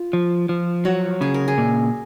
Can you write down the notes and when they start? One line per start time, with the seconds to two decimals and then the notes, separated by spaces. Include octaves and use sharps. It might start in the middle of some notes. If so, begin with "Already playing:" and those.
Already playing: F4
0.13 F3
0.49 F3
0.85 F#3 F#4
1.21 C#3 G#4
1.34 A#4
1.48 G#4
1.58 A#2